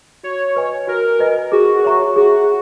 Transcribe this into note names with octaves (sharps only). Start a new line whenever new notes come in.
F#4 C#5
B4 D#5 G#5
F#4 A#4
B4 D#5 G#5
F#4 G#4
C#5 E5 A#5 C#6
F#4 G#4